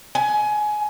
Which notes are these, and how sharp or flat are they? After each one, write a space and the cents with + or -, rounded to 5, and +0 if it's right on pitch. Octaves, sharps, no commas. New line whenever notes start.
G#5 +20